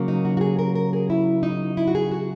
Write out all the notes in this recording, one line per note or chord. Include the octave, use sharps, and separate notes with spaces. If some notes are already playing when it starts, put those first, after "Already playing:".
Already playing: C#3 F#3 A#3
D#4
F#4
F#4
G#4
A#4
A#4
G#4
E4
D#4
E4
F#4
G#4
F#4